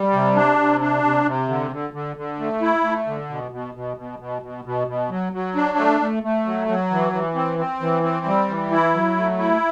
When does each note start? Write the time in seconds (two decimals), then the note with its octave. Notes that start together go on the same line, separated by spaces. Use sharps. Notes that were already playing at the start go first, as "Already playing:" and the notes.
Already playing: G3
0.13 C3
0.36 D4
0.58 C3
0.81 D4
1.04 C3
1.26 C3
1.48 D3
1.71 D3
1.93 D3
2.16 D3
2.39 A3
2.61 E4
2.84 A3
3.07 D3
3.30 B2
3.51 B2
3.74 B2
3.97 B2
4.19 B2
4.42 B2
4.65 B2
4.87 B2
5.10 F#3
5.33 F#3
5.55 D4
5.78 A3
6.01 A3
6.23 A3
6.46 F#3
6.68 F#3
6.91 E3
7.13 E3
7.36 C4
7.58 C4
7.81 E3
8.03 C4
8.26 G3
8.48 E3
8.71 E4
8.94 F#3
9.16 A3
9.39 E4